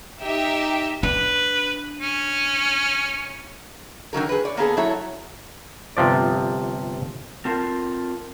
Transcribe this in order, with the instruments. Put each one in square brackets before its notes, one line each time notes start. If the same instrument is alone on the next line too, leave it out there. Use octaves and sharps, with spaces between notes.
[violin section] D#4 G4 E5
[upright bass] D4 [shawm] B4
[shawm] C#4
[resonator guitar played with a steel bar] D3 D#3 F#3 A#4
G#4 B4
C#5 D5
A#3 B3 G#4 A4
F#3 E4 A4 C#5
[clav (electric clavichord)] G1 C3 F3 D5
[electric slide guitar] C4 F4 A#4 A5